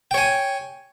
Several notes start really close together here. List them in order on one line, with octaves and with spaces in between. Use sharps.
G5 C#5 G#5